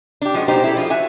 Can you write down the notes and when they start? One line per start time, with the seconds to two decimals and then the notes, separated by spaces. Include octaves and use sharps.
0.22 D4 G4
0.34 F3 G#3 F#4
0.48 B2 D#4 G4 C5
0.64 E4 G4 A4
0.77 F3 F4 G#4
0.90 F#4 E5 G#5